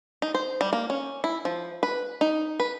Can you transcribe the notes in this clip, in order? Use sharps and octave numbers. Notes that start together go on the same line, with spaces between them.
D#4
C5
G3
A#3
C#4
E4
F3
B4
D#4
B4